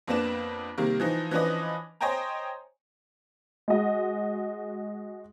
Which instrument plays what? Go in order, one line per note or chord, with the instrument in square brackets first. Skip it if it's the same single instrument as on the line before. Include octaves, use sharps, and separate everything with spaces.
[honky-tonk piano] F2 A#3 B3 D4 E7
C3 D#3 G3 A#3
E3 F3 D#4
E3 F3 C#4 D4 B4 D#5
C5 C#5 D#5 G5 G#5 A#5
G#3 F#4 D#5